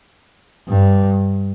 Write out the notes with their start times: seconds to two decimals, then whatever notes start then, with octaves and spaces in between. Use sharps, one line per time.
0.69 G2